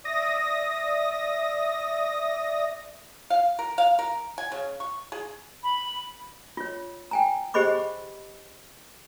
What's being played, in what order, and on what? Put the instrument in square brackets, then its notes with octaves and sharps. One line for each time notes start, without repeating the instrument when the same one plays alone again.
[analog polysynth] D5 E5 D#6 A#6
[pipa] F5
A#4
F5
A#4
G#5
C#3
C#6
G#4
[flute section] B5
[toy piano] F4 C#5
G5 G#5 A#5
G4 G#4 C5 D#5 B5 D6